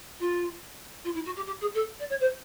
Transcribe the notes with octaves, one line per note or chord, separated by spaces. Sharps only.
F4
F4
E4
F#4
G4
G4
G#4
A4
D5
C#5
C5